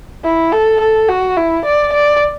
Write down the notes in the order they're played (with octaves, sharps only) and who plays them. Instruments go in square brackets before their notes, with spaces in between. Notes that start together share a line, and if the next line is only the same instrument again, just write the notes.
[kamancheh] E4
A4
A4
F#4
E4
D5
D5